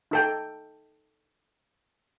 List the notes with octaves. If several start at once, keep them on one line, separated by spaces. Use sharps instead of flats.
D#4 A4 G5